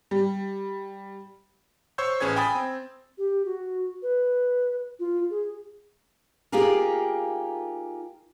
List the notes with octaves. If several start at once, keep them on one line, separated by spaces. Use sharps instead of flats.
G3
C5 C#5 C#6 E6 G6
A1 C#4 G#4 B4 G#6
G5 G#5 B5 D#6 A6
C4
G4
F#4
B4
F4
G#4
A#3 D#4 F4 G4 G#4 A#4